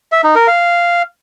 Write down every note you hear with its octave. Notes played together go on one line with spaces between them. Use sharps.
E5
D#4
A#4
F5